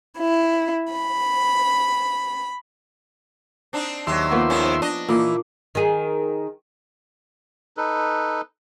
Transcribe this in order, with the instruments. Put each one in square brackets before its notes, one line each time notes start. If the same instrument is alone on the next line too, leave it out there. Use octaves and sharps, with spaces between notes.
[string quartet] E4
B5
[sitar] C4 D4 D#4
[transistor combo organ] D#2 E5 C6 [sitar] F#3 G4
[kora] F3 A#3 B3
[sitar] G#2 D#3 C#4
D4 D#5
[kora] A#2 A#3 [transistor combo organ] E3 [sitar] D#4
[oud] D#3 G#4
[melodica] D#4 A4 B4